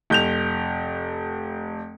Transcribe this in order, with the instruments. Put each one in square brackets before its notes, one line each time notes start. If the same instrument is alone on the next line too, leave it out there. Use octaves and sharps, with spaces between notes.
[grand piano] F1 G6 F7